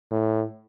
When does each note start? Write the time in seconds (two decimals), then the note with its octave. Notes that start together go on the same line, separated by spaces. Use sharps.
0.11 A2